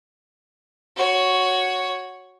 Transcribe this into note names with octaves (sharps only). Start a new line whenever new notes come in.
F#4 C#5